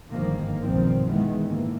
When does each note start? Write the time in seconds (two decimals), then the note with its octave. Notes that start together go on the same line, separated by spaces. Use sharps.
0.11 G1 G#2 D#3 F3 A#3
0.60 B1 G2 D#3 F3 C4
1.08 D#3 E3 G#3 B3
1.43 G#2 B2 D3 E3 A#3